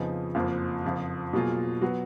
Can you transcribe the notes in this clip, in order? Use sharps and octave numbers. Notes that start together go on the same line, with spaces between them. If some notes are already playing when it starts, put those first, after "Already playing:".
Already playing: F2 C#3 F3 B3 D#4
F#1 F2 F3 A#3
F#1 F2 F3
B2 F#3 A#3 F4 G#4
F#3 B3 F#4